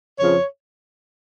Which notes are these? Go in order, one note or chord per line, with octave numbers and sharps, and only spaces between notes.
F2 C#3 F3 C#5